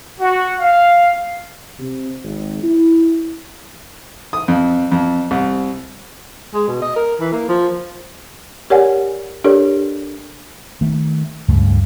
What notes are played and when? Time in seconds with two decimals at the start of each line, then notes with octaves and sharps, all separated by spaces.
0.20 F#4
0.61 F5
1.79 C3
2.24 G#1
2.63 E4
4.33 D#6
4.48 F2
4.92 F2
5.31 C2
6.54 G#3
6.68 B2
6.81 D#5
6.96 A#4
7.21 E3
7.33 A#3
7.49 F3
8.70 G4 A#4 C#5 D5 F#5 G#5
9.44 D4 G4 A4 A#4 C#5 D5
10.81 D#3 A3
11.48 C#2 G2 C#3 A3